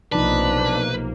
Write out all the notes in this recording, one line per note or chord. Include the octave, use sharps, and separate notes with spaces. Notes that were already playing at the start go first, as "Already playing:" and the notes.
B1 C3 F3 A#3 D4 D#4 B4